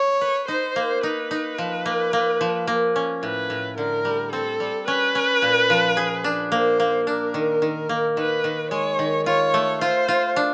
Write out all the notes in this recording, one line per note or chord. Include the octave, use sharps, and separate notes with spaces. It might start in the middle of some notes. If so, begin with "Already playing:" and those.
Already playing: C#5
B4
D#4 C5
A#3
D#4 B4
D#4
F3
A#3
A#3
F3
A#3
C#4
A2 B4
A2
D3 A#4
G3
C4 A4
G3
C#4 B4
C#4
A#2
F3
G#4
D4
A#3 C5
A#3
D4 A#4
D#3
D#3
A#3
D#3 B4
D#3
G#3 C#5
D#3
F4 C#5
A3
F4 C5
F4
D4